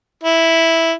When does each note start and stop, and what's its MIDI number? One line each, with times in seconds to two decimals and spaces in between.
0.23 0.92 64